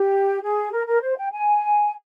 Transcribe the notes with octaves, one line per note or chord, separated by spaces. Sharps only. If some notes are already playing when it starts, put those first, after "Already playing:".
Already playing: G4
G#4
A#4
A#4
C5
G5
G#5